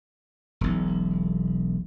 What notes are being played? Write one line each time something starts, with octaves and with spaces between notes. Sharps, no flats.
E1 B1